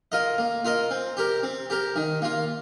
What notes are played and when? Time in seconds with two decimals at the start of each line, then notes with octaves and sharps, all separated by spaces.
0.12 F4 A#4 D#5
0.38 A#3
0.65 F4 A#4 D#5
0.91 C4
1.17 G4 A#4
1.43 C4
1.70 G4 A#4
1.96 D#3
2.22 A#3 F4